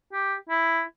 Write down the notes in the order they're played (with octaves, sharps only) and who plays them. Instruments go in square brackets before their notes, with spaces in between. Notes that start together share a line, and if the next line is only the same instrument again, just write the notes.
[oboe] G4
E4